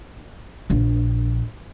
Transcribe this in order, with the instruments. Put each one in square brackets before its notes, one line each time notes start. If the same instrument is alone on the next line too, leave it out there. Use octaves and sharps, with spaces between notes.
[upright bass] A#1 D4